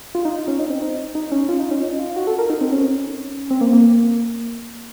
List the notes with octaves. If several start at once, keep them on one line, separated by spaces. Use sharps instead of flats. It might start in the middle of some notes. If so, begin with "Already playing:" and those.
F4
D#4
C#4
D#4
C4
D#4
D#4
C#4
F4
D#4
C#4
D#4
F4
F#4
A4
A#4
D#4
C4
C#4
C4
A#3
A#3